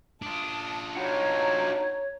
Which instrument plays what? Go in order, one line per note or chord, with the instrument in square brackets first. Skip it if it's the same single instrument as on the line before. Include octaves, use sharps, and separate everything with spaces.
[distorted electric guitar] D4 F4 [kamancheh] A5 D#6
[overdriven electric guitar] D#4 F#4 [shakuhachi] C#5 [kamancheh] A#5